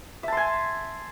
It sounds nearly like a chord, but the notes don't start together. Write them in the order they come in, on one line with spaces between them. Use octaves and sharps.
E5 A5 C6 G#5